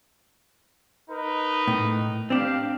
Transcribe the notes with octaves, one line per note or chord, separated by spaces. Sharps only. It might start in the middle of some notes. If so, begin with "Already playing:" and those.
D#4 A#4 B4
A2
C4 D4 G4 F5